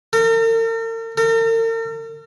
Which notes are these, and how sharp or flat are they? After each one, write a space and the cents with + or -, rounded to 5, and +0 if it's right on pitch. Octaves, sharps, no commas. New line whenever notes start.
A#4 -45
A#4 -45